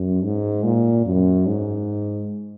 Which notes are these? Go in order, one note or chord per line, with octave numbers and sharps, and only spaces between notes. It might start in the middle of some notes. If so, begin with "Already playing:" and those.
Already playing: F#2
G#2
A#2
F#2
G#2